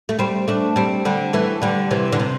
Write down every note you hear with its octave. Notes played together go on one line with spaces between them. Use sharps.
A3
G3 C4
A3 D4
G3 C4
D3 G3
E3 A3
D3 G3
C3 E3
D3
C3